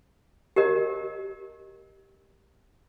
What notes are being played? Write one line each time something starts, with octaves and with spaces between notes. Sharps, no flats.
G4 A#4 D#5